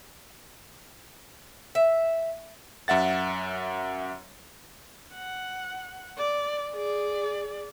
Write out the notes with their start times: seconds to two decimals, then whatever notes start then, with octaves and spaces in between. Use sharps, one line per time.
1.75 E5
2.88 F#2 E5 F#5 A6
5.14 F#5
6.18 D5
6.72 G#4 D5